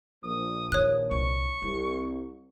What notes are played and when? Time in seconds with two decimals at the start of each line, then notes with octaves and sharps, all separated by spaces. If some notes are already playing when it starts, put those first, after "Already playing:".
0.24 A#1 D#6
0.72 D#3 C#5 F#6
1.11 C2 C#6
1.62 C2 E4